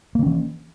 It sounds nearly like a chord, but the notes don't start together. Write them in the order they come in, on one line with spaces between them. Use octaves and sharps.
A#3 D3 C#4 E3